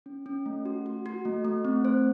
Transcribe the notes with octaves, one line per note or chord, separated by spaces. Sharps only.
C#4
C#4
A3
F#4
F#4
F#4
A3
A3
C4
C5